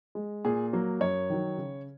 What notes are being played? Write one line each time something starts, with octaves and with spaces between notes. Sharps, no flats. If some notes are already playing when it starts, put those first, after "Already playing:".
G#3
A#2 G#4
F#3 A#3
F#2 C#5
D#3 F#3
C#3